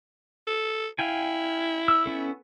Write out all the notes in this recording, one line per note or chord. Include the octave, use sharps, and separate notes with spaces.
A4
E4 F5 G5 G#5
E6
B3 C#4 A4